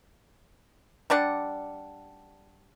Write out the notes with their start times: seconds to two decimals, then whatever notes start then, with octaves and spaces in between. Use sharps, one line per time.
1.10 G3 D4 D5 F#5